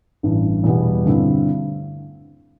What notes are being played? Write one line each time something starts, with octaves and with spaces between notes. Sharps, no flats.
A1 G2 E3
E2 B2 G3 B3
G2 D3 A3 C4 E4